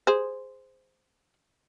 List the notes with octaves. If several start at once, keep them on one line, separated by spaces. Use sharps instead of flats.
G#4 C5